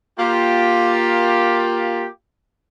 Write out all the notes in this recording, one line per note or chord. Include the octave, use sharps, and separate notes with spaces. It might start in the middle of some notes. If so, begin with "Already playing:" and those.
A#3 F4 G4